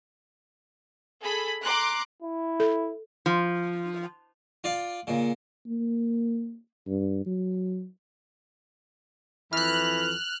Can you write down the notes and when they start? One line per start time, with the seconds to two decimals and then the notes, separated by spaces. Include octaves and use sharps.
1.22 G#4 A4 B5
1.63 A#5 C6 D6 F#6
2.23 E4
2.60 A4
3.26 F3
4.64 F4 D5 F5
5.07 A#2 C#3
5.66 A#3
6.87 G2
7.26 F#3
9.53 F2 E3 F6 F#6